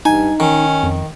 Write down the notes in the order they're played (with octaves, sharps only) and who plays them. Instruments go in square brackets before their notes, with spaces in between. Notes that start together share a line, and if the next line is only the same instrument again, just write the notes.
[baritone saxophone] G2 [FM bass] D#4 [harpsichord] G#5
[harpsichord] D#3 [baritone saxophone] C#4
[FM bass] F2